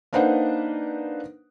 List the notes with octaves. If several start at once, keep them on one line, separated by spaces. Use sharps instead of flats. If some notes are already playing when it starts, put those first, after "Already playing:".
A#3 D4 D#4 B4 C5 F#5